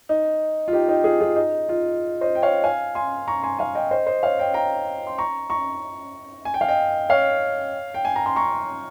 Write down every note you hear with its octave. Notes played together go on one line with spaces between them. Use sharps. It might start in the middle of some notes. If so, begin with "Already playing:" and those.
D#4
F4
D#4 G4
D#4 G4
F4 G#4
F4 G#4
D#4
F4
C5 D#5
G5
C#5 F5
F5 G#5
G#5 C6
A#5 C#6
G#5 C6
F5 G#5
D#5 G5
C5 D#5
C5 D#5
C#5 F5
D#5 G5
G5 A#5
C6
A#5 C#6
A#5 C#6
G#5
G5
F5
D#5 G5
C#5 F5
G5
G#5
A#5
C6
A#5 C#6